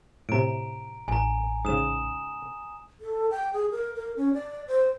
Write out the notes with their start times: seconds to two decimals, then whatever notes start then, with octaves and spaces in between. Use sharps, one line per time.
0.29 A2 C3 A#5 D7
1.08 A1 G#5 A#5
1.65 G#2 C#3 D#6 E7
3.00 A4
3.31 G5
3.54 G#4
3.71 A#4
3.96 A#4
4.17 C#4
4.34 D5
4.68 C5